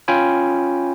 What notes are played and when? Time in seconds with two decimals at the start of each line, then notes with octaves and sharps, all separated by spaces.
0.08 C#4 F4 G5 G#5 B5